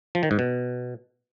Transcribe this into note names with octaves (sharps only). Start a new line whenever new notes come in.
F3
D#3
G#2
B2